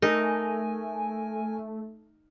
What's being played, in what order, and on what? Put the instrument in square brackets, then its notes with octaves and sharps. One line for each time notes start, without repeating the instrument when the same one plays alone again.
[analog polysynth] A3 [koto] D#4 [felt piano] A#4 [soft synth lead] G#5